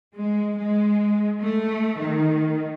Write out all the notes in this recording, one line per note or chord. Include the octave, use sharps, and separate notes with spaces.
G#3
G#3
A3
D#3